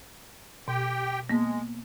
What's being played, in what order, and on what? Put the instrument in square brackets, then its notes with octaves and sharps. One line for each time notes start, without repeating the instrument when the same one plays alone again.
[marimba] B2 [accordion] G4 G5
[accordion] G#3 [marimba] A#3 B3